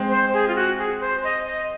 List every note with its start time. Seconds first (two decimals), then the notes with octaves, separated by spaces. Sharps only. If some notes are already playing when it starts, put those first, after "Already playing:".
Already playing: G#3 C4
0.09 C5
0.33 G#4
0.48 F4
0.55 F#4
0.78 G#4
1.01 C5
1.23 D#5
1.46 D#5